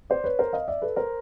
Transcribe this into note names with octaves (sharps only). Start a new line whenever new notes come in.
C5 D5
B4 C#5
A#4 C5
D#5 F5
D5 E5
A4 B4
A#4 C5